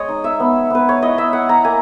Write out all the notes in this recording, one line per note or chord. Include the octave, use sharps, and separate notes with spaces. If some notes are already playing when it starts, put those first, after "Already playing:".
Already playing: G#3 C#5 D#5
D#4
E5
B3
B3 B4
C#5
E4 D#5
E5
E4 F#5
A#5
A#3 G#5